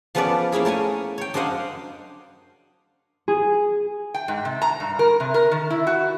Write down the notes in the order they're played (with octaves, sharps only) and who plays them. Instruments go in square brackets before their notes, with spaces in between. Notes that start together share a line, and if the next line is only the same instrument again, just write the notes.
[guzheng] F3 B3 C#4 A4 B4 D5
A#3 C#4 E4 G#4
A3 A#4 C#5 G#5
C#5 G5
F#2 D4 C5 D#5 F5 F#5
[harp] G#4
[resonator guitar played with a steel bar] G5
G#2
C3
A#5
G2
A#4
C3
A#4
D#3
E4
F#4